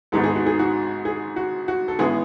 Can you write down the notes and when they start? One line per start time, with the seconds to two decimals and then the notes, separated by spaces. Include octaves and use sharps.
0.12 G#1 G#2 G#3 B3 A4
0.24 G#4
0.36 F#4
0.46 G#4
0.59 F#4
1.05 G#4
1.36 F#4
1.68 F#4
1.88 A4
1.99 A1 A2 G#3 B3 G#4